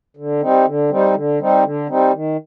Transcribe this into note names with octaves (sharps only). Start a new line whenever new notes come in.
D3
G3 C4 D#4
D3
G3 C4 D#4
D3
G3 C4 D#4
D3
G3 C4 D#4
D#3